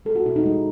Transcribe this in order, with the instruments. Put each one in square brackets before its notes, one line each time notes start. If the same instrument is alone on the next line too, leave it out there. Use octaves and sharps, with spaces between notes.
[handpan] G#3 A4
F#4
B2 E4
D#4
G#3